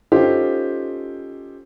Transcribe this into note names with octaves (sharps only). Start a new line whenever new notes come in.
C#4 D#4 F4 G4 A4 C5